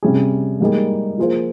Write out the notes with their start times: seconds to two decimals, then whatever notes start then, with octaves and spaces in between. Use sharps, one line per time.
0.03 C3 G3 C#4 G#4
0.60 G#2 G3 A#3 D#4 G#4
1.18 F3 A#3 F4 G#4 C5